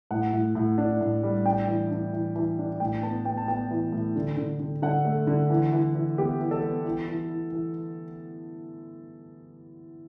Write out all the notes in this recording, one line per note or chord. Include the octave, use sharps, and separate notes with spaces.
A2 F#5
A2
A2
D4
A2
G3
D4 G5
E3
D4
E3
E3
D4
A2 G5
B3 A5
B3 G5
A5
B3 G5
E3
A2
D3
D3
D3
D3 F#5
A3
D3
E3
E3
E3
B3 G4
E3
A4
B3
E3
E3
E4
E3